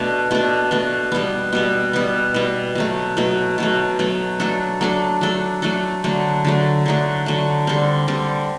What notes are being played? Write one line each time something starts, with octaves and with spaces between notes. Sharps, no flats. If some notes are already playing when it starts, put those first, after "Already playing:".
Already playing: B2 A3 D4
B2 A3 D4
B2 A3 D4
B2 G3 B3
B2 G3 B3
B2 G3 B3
B2 G3 B3
B2 F#3 A3
B2 F#3 A3
B2 F#3 A3
B2 F#3 A3
F#3 A3 D4 A4
F#3 A3 D4 A4
F#3 A3 D4 A4
F#3 A3 D4 A4
D3 F#3 A3
D3 F#3 A3
D3 F#3 A3
D3 F#3 A3
D3 G3 C4
D3 G3 C4